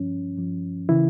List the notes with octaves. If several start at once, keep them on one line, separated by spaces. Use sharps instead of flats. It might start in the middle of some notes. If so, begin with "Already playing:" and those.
Already playing: G2 F3 C#4
G2 F3
C#3 E3 E4